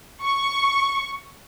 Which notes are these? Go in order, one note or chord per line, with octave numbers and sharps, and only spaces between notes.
C#6